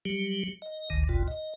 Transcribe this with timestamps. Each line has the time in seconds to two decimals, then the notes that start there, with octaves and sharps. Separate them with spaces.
0.05 F#3 G3 G4
0.62 D#5
0.90 G#1 D2 D#3
1.09 G1 C2 F2 B2 F4
1.28 D#5